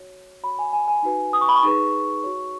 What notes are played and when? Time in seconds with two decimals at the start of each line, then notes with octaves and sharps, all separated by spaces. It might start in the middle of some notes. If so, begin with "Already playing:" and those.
Already playing: F#4 C#5
0.43 F#4 C#5 B5
0.59 G#5
0.73 G#5
0.88 G#5
1.03 D#4 F#4 B4
1.33 D#6
1.41 C#6
1.48 B5
1.56 C#6
1.63 D#4 G#4 B4
2.24 F#4 C#5